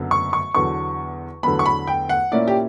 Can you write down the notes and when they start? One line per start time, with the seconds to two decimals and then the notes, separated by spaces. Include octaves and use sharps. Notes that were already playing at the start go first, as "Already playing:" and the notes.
Already playing: F#1 F#2 D3 F#3 B3
0.11 C#6
0.33 C#6
0.55 E2 D3 F#3 B3 C#6
1.43 E2 D3 F#3 B3 B5
1.59 C#6
1.66 B5
1.87 G5
2.09 F#5
2.32 A#2 A#3 C#4 E4 D5
2.48 G4